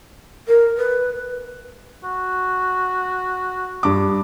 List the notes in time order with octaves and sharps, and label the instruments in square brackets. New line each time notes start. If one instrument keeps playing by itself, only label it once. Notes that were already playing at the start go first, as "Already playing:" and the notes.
[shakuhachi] A#4
B4
[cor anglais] F#4
[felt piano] G2 D6